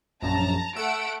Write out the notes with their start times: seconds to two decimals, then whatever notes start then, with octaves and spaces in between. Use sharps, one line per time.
0.22 A#1 F#2 A5 A#5
0.76 A3 F#5 E6 D7